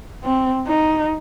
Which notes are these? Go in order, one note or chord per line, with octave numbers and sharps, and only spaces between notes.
C4
D#4